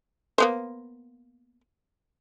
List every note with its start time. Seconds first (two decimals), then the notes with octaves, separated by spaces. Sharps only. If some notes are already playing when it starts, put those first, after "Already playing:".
0.38 A#3 B3 C5